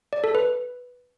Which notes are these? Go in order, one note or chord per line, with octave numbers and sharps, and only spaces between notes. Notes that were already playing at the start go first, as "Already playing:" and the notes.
D5
A4
B4